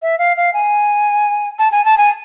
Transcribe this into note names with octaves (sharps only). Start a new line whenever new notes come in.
E5
F5
F5
G#5
A5
G#5
A5
G#5